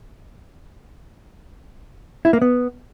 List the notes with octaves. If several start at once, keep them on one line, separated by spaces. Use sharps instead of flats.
E4
A#3
B3